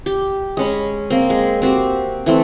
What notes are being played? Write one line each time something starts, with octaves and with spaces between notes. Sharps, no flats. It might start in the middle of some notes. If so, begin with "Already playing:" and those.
G4
G#3 C#4 B5
A#3 C4
G#3
C4 F#4 G4
E3 A3 C4